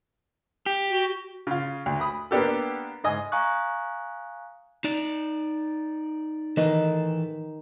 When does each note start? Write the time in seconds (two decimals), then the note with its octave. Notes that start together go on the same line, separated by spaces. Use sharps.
0.66 G4
0.90 F#4
1.47 C#3 F4
1.86 D2
2.00 B5 D#6
2.31 A#3 B3 D4 G4 A4
3.04 G#2 D#5 G#5
3.32 F5 G#5 A#5 C#6 D#6 F#6
4.84 D#4 D5
6.57 D#3 E3 D#4 A4 B4 D#5